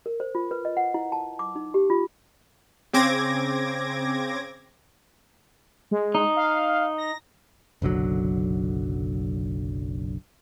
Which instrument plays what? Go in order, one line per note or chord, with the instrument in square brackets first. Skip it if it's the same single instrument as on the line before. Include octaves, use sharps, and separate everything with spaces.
[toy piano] A#4
C5
F4
B4
D#5
F#5
E4
A5
D6
D#4
G4
F4
[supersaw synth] C#3 C4 D6 G#6 A#6
[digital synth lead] G#3
[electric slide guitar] D#4
[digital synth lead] F5
A#6
[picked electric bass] F#1 B1 D3 F#3